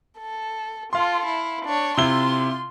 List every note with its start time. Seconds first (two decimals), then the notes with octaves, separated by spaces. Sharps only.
0.19 A4
0.93 F4 A4 F5 C6
1.26 E4
1.65 D4 C#5
1.97 C3 E4 F4 C6 G7